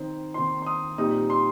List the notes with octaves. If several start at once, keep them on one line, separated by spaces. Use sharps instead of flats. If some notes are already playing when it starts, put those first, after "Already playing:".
Already playing: D#3 C4 D#4 C5
D#3 C4 D#4 C6
C6
D#6
A#2 G3 C4 D#4 D#6
C6